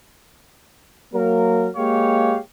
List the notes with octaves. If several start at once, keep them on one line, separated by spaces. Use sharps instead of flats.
F#3 A#3 A#4
G#3 A#3 G4 C#5 F5